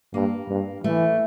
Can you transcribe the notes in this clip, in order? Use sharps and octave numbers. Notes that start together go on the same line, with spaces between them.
G2 A#3
G2
E3 A3